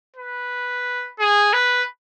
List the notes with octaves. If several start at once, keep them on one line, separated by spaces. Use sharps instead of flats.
B4
G#4
B4